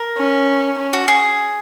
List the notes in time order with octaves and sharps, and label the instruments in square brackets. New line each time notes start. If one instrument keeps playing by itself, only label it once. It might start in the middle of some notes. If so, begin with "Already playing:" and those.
Already playing: [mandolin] A#4
[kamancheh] C#4
C#4
[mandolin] F#4
G#4